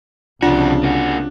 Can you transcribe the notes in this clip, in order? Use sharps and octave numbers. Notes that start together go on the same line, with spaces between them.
C2 F2 C#3 D4 F4 F#4
A#3 F#4